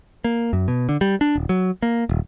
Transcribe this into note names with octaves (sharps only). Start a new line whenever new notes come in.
A#3
F#2
B2
D3
G3
D4
D#1
F#3
A#3
D#1